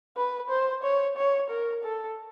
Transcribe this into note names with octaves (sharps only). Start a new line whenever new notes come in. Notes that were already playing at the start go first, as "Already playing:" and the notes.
B4
C5
C#5
C#5
A#4
A4